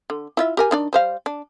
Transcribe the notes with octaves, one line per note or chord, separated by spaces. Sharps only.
D3
E4 F4 E5
G4 A#4 G#5
D#3 D4 D5
G3 C5 F5
D4